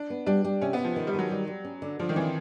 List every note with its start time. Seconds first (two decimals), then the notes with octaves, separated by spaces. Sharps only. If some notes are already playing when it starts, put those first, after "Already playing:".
Already playing: D4
0.10 B3
0.26 G3 D4
0.44 G3
0.61 C3 C#4
0.73 B3
0.79 C3
0.84 F3
0.96 D#3
1.07 G3
1.14 D#3 F#3
1.31 G3
1.47 G3
1.65 C#4
1.82 D3
1.99 D3 F3
2.09 D#3
2.16 E3 C4